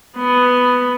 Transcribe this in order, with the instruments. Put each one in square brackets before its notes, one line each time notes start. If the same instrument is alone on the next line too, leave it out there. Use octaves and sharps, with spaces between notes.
[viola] B3